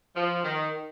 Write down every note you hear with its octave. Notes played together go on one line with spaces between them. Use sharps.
F3
D#3